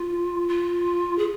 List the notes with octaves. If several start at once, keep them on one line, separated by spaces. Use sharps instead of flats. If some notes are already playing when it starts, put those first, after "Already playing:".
Already playing: F4
F4
G#4